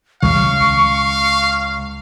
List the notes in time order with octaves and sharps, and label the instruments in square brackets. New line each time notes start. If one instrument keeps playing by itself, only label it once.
[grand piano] C#2 [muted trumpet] F5 [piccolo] C#6